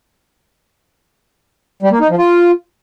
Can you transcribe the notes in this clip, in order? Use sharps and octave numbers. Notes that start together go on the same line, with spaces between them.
G3
A#3
D#4
F3
F4